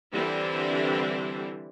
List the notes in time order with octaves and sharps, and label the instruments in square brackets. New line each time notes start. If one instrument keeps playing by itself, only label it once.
[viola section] D3 E3 G3 C4 D4 E4